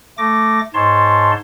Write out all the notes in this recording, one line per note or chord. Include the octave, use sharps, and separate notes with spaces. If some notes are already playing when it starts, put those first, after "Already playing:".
A3 D6 A#6
G#2 C#5 A5 C6